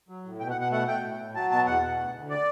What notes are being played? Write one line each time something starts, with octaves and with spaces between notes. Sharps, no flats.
F#3
A2
B2 G5
F#5
B2
F#5
A3 F#5
A3 G5
A2
A2
F#3 A5
B2 A5
E2 F#5
B2
D2
D2
D5